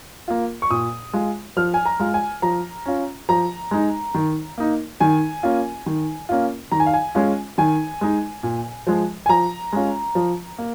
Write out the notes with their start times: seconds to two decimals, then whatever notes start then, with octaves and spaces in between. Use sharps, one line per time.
0.28 A#3 F4
0.62 C#6
0.70 A#2 D#6
1.13 G#3 F4
1.57 F3 F6
1.74 G#5
1.86 A#5
2.00 G#3 F4
2.14 G#5
2.42 F3 A#5
2.86 C#4 F4
3.29 F3 A#5
3.71 G#3 D#4
4.15 D#3
4.58 A#3 D#4
5.01 D#3 G#5
5.43 A#3 C#4 F4
5.86 D#3
6.29 A#3 C#4 F4
6.72 D#3 A#5
6.80 G#5
6.86 F5
6.94 G#5
7.15 G#3 C#4 F4
7.58 D#3 G#5
8.01 G#3 D#4
8.43 A#2
8.87 F3 G#3
9.26 G#5
9.29 F3 A#5
9.73 G#3 C#4 F4
10.15 F3
10.58 A#3